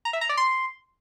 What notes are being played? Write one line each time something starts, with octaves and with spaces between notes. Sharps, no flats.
A#5
E5
A#5
D5
C6